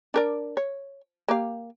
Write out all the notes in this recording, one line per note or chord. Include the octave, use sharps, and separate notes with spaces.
D4 A#4 D5
C#5
A#3 G4 F5